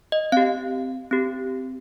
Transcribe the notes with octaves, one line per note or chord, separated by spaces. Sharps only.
D#5
C4 G4 F5
C4 G4